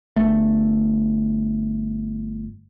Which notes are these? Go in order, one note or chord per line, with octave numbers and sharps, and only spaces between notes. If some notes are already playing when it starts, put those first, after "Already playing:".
G1 A3